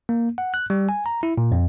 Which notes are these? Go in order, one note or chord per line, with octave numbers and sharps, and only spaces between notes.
A#3
F#5
F#6
G3
G#5
A#5
E4
A#2
F2